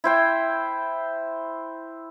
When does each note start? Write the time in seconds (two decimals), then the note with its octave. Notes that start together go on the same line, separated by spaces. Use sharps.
0.04 E4 C5 G5